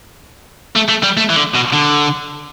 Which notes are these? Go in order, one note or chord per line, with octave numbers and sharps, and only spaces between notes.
A3
A3
G3
A3
E3
D3
B2
D3